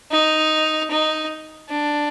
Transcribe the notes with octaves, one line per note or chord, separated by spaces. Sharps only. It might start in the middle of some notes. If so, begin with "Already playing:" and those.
D#4
D#4
D4